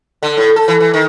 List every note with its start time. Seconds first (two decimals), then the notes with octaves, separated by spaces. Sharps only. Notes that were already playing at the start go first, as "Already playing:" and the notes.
0.23 D3
0.37 A2
0.56 A4
0.68 E3
0.80 E3
0.94 D#3